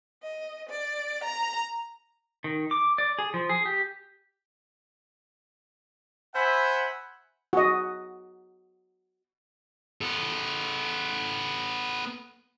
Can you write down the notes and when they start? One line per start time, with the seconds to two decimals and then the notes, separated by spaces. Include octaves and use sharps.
0.22 D#5
0.69 D5
1.24 A#5
2.44 D#3
2.71 D6
2.98 D5
3.19 G#4
3.34 F3
3.49 G#4
3.66 G4
6.34 C5 E5 F#5 G#5 B5
7.53 F#4 D#5
10.01 B3 A4